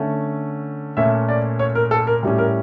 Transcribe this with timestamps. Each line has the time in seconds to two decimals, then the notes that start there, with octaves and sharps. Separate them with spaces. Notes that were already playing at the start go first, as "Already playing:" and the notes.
Already playing: D3 A3 C#4
0.97 A#2 A3 C#4 E5
1.29 D5
1.59 C#5
1.75 A#4
1.91 A4
2.07 A#4
2.23 A2 G3 C#4
2.38 A#4